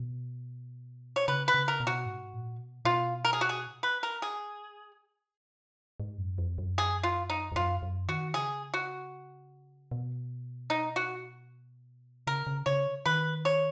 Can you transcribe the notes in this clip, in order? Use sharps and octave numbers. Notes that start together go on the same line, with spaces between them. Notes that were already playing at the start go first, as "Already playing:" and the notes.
Already playing: B2
C#5
C#3 B4
B4
C#3
A#4
B2
F#4
G#2
A#2
B2
B2 F4
A#4
G#4
F#4
G#4
B4
A#4
G#4
G#2
F#2
F2
F#2
G#4
F4
D#4
F2
F#2 F4
F#2
D#3 F#4
C#3 G#4
F#4
B2
D#4
F#4
C#3 A#4
C#3
C#3 C#5
D#3 B4
C#5